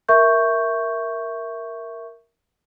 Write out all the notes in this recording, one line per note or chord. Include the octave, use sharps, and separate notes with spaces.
A#4 E5 C#6 G6